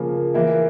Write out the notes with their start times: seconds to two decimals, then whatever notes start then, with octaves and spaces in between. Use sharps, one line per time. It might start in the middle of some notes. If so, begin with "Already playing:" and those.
Already playing: C#3 F3 A#3
0.34 E3 A#3 E4